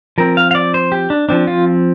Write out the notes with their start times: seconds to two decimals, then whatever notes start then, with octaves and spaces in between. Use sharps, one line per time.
0.18 F3 C4 A#4
0.37 F5
0.51 F5
0.55 D5
0.74 C5
0.92 G4
1.10 D4
1.29 F3 C4 D4
1.47 F4